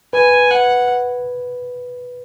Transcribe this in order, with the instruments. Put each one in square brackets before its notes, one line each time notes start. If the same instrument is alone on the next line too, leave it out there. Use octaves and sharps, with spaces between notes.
[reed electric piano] B4 [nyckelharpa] G#5
[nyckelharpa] F#5